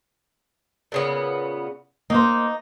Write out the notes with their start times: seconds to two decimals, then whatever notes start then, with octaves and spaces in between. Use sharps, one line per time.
0.92 A#2 C#3 B3
2.10 A#3 D#4 C5